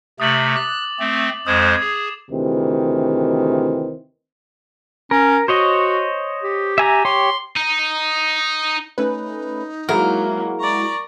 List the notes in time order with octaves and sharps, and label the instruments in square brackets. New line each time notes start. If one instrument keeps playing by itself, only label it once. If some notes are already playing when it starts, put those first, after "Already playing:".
[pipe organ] C3 A3 [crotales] D#6 A6 F#7
[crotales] D6 [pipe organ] F#6
[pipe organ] A3 C4
[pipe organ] F2 G#3 C5 [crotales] D#6 G#6 E7
[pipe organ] G#4
[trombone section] D2 C3 D#3 E3 C4
[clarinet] C#4 [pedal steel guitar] A#4
[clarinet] F#4 [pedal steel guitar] C5 C#5 D#5
[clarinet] G4
[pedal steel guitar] E5 G#5 A#5
[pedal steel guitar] G4 C#5 [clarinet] C6
[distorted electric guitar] D#4
[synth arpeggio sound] A3 C#4 B4 [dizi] D#4
[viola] F#3 A#3 [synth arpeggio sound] G#3 E4 F#4 [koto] A#4
[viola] D5 A#5 [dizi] C#6